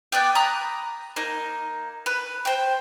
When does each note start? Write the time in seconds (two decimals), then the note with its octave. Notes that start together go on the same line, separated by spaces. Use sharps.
0.12 B3 D5 G5
0.35 A#5 B5 D#6 F#6
1.16 A#3 D#4
2.06 B4
2.45 C5 G5